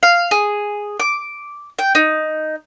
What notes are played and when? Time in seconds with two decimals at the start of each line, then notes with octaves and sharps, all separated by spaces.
0.03 F5
0.31 G#4
1.00 D6
1.79 G5
1.95 D#4